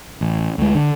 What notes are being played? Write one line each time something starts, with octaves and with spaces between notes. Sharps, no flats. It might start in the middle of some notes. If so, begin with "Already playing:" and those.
A1
D2 G#3
D3